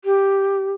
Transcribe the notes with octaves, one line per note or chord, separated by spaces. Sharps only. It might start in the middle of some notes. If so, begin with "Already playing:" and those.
G4